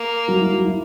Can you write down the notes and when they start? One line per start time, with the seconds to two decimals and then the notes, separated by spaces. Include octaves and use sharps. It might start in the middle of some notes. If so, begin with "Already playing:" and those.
Already playing: A#3
0.28 F#3 F#4
0.40 E4
0.53 F#3 F#4
0.65 E4